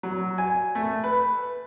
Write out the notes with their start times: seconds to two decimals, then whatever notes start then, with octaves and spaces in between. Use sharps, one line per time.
0.03 F#3
0.38 G#5
0.75 A3
1.04 B4